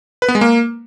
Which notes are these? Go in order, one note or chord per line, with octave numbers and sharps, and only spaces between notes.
B4
B3
G#3
A#3